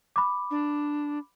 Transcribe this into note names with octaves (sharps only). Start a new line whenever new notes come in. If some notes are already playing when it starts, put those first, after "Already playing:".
B5 D6
D4